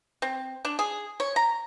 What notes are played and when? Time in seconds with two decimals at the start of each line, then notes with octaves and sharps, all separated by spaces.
0.22 C4
0.65 D4
0.79 G#4
1.20 C#5
1.36 A#5